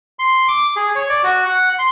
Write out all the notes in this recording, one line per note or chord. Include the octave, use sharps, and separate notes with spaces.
C6
D6
G#4
C#5
D5
F#4
F#5
C6